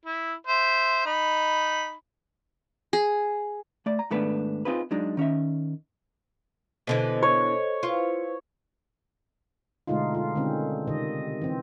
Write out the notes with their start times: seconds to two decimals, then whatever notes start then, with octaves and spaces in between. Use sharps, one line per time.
0.06 E4
0.47 C5 E5
1.06 D#4 B5
2.93 G#4
3.86 A3 D5
3.99 A#5
4.11 G#2 D#3 A3 B3 D4 B4
4.65 C4 D#4 F4 G#4 B4
4.91 F#3 G#3 D4 D#4
5.17 D#3 C#4 D#4 E5
6.87 B2 D3 E3 A4 C5 D#5
7.23 C#5
7.83 E4 F4 B4 C5
9.87 B2 D3 G#3 A3 D#4 F4
10.15 F4
10.35 D3 D#3 G#3 C4 C#4
10.87 C3 D#3 D#5
11.42 E3 C4